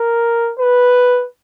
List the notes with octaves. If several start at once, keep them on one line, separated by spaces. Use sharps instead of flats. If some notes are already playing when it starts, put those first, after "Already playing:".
Already playing: A#4
B4